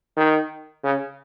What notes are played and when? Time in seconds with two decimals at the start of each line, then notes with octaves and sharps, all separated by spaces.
0.17 D#3
0.84 C#3